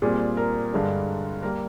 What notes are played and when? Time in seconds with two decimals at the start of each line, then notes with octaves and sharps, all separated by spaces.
0.02 A#2 G3 C4 G#4
0.37 A#4
0.72 G2 D3 G#3 D4
1.43 G3 A#3 A#4